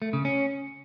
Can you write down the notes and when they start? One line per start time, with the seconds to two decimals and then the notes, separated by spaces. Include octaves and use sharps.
0.02 A3
0.13 C#3
0.25 C#4